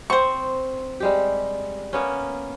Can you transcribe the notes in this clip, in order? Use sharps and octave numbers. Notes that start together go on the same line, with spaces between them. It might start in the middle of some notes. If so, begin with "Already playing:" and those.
C4 C5 C#6
G3 G#3 G4
A#3 B3 C#4